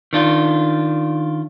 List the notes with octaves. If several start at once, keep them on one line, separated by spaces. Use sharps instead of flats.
D#3 D4 F4